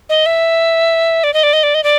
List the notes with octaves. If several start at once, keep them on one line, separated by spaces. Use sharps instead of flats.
D#5
E5
D5
D#5
D5
D#5
D5
D#5
D5